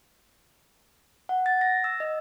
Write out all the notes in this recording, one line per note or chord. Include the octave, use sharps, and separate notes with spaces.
F#5
A6
A#6
E6
D#5